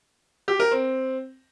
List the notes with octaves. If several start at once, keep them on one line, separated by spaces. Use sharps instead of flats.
G4
A#4
C4